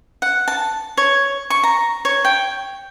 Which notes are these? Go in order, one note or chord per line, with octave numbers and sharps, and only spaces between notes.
F#5
A5
C#5
C#6
A#5
C#5
G5